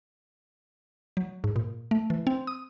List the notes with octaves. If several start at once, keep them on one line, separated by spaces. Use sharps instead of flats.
F#3
G#2
A#2
A3
E3
C4
D#6